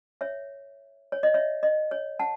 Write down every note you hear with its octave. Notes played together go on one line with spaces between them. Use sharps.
C#5 E5
C#5
D#5
C#5 E5
D#5
C#5
F#5 A5